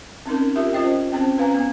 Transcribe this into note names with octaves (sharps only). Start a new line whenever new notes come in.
C4 C#4 D#4 A#4
F4 G4 A#4 E5
C#4 F4 C5 D#5 G5
C4 C#4 C5 G5
C#4 B4 F5 G#5 A#5
B3